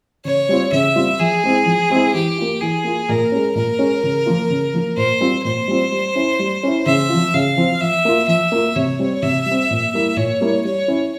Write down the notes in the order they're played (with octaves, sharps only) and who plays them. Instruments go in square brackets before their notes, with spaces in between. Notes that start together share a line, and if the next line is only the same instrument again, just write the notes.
[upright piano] C#3 [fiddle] C#5
[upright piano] G3 C4 F4
[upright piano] C#3 [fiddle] E5
[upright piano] G3 C4 F4
[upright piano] F3 [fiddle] G#4
[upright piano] G#3 C4 E4
F3
G#3 C4 E4
[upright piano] E3 [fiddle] G4
[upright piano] A#3 F4
[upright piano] E3 [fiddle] G#4
[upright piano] A#3 F4
[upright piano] A#2 [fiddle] A#4
[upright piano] G#3 C#4
[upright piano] A#2 [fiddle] A#4
[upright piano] G#3 C#4
C#3
F3 A#3 F4
C#3
F3 A#3 F4
[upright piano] A#2 [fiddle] C5
[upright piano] G3 C4 F4
[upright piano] A#2 [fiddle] C5
[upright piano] G3 C4 F4
G3
C#4 E4
G3
C#4 E4
[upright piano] C#3 [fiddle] E5
[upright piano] F3 C4 F4
[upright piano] C#3 [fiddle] F5
[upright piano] F3 C4 F4
[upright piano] F3 [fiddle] E5
[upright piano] A#3 F4
[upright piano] F3 [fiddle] E5
[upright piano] A#3 F4
[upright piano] C3 [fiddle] C#5
[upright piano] G3 C4
[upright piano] C3 [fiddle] E5
[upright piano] G3
C4
A#2
G3 A#3 E4
[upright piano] A#2 [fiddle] C#5
[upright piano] G3 A#3 E4
[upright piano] G3 [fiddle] C#5
[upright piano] C#4 E4